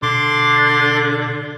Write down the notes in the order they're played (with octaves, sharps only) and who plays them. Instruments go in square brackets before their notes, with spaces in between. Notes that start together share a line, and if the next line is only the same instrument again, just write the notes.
[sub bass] B2 [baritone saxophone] D3 [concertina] C6 D6